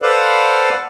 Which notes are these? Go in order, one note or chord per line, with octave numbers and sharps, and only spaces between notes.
A4 B4 C5 D5 F5 F#5